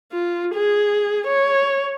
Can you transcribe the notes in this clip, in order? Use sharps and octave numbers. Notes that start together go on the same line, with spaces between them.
F4
G#4
C#5